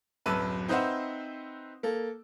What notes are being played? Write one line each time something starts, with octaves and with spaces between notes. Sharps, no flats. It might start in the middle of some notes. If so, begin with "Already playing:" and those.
D1 F#2 B4 A5 E6 D#7
C4 D#4 B4 C5 E5 F#5
A#3 A4